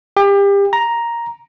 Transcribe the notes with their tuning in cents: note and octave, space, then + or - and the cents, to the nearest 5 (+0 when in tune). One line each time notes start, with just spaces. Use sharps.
G4 +30
A#5 +5